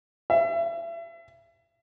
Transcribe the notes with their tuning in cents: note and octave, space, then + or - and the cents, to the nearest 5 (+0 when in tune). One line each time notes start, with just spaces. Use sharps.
E5 +35